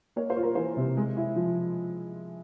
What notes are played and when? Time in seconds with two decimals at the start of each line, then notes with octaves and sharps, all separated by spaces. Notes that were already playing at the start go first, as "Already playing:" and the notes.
0.16 A#3 C#5
0.30 C5
0.36 F4
0.43 A#4
0.55 E3 C5
0.77 C3
0.97 G#3
1.17 E4
1.36 F3